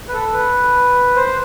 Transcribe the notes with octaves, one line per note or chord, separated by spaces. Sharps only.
B4
A4
B4
C5